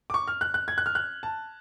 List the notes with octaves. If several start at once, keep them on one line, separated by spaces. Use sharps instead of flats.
D6
C#6
F6
F#6
F#6
G#6
F#6
F6
F#6
A5